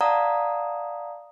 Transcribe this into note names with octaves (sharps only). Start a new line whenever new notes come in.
D5 F5 F#5 A5 A#5 D#6